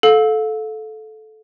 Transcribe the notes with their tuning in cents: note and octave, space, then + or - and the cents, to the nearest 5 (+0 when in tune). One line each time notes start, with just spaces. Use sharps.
A4 -15 F5 +30